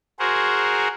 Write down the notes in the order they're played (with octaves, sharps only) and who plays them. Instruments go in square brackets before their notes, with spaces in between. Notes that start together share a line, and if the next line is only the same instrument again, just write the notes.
[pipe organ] F#4 G#4 A#4 C5 F#5